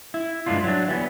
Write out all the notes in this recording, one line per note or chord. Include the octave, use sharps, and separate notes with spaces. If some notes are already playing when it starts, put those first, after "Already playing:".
E4
G2 G#3 B3 D4 E4 F4
F#3 D4
E3 G3 A#3 B3